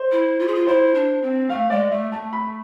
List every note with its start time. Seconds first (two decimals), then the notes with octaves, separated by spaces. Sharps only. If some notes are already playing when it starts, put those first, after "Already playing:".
Already playing: C5
0.12 E4
0.39 F4
0.47 G#4
0.55 F4
0.67 E4 C5
0.94 D4
1.23 C4
1.49 A3 F5
1.70 G#3 D5
1.91 A3 E5
2.12 A3 A5
2.33 B5